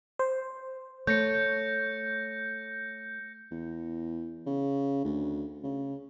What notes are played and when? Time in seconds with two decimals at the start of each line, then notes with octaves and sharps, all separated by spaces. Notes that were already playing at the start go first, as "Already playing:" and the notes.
0.19 C5
1.07 A3 C#5 G6 A#6 C#7
3.51 E2
4.46 C#3
5.05 D2
5.63 C#3